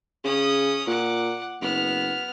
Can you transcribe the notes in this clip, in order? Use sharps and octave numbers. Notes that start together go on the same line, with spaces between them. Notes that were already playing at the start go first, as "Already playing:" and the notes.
C#3 C#4 D#6
A#2 F#5 D6
F#1 B3 F6